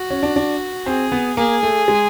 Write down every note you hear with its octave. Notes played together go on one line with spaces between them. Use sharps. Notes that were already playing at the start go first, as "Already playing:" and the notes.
Already playing: F#4
C#4
D4
D4
C4 G#4
B3
A#3 G#4
A3
G#3